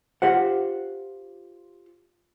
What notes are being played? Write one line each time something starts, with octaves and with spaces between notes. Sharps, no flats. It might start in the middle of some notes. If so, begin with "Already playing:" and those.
F4 G4 C5 F#5